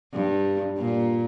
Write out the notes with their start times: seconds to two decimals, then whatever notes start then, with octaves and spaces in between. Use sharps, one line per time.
0.13 G2
0.78 A#2